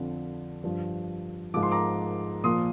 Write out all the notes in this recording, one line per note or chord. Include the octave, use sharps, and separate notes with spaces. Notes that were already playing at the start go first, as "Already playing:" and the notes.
Already playing: F2 D3 F3
G2 F3
G#2 F3 D6
C6
A#5 D6
A#2 F3 C6 D#6